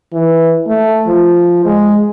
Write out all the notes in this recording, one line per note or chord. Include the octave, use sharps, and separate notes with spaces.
E3
A3
F3
G#3